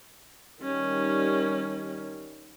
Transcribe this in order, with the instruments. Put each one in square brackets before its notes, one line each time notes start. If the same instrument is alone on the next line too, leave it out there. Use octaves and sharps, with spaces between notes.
[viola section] D#3 G3 [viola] C#4